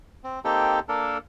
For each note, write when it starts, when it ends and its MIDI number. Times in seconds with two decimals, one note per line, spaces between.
0.24 0.39 60
0.45 0.80 58
0.45 0.80 60
0.45 0.80 63
0.45 0.80 67
0.45 0.80 69
0.45 0.80 79
0.89 1.18 58
0.89 1.18 62
0.89 1.18 69
0.89 1.18 70